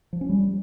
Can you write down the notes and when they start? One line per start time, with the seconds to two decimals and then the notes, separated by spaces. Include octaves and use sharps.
0.13 F3
0.21 C#4
0.29 G3